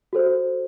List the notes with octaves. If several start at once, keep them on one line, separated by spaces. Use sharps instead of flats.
F#4 A4 C5